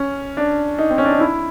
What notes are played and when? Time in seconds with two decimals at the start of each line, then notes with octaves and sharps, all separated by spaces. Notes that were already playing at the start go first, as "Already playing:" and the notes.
Already playing: C#4
0.37 D4
0.78 D#4
0.90 C4
0.98 C#4
1.05 D4
1.13 D#4
1.20 E4